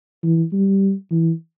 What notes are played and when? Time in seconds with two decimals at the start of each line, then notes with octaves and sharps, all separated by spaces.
0.23 E3
0.52 G3
1.11 E3